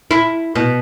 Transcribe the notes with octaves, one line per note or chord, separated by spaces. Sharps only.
E4
B2